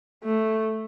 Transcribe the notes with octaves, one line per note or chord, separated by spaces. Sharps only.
A3